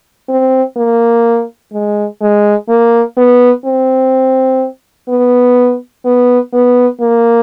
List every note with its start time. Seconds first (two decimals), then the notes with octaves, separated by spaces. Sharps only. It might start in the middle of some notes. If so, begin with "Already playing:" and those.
0.29 C4
0.77 A#3
1.72 G#3
2.21 G#3
2.69 A#3
3.17 B3
3.65 C4
5.09 B3
6.05 B3
6.53 B3
7.01 A#3